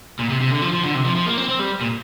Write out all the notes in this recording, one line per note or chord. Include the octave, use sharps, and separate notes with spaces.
A#2
C3
C3
D3
F3
F3
D3
C3
F3
F3
A#3
C4
C4
G3
A#2